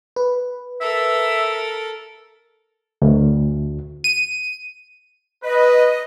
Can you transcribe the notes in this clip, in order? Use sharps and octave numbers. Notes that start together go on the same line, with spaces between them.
B4
A4 A#4 E5
D2
D#7
B4 D#5